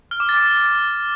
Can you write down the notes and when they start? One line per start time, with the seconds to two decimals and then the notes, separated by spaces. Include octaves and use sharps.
0.11 F6
0.20 D6
0.29 A6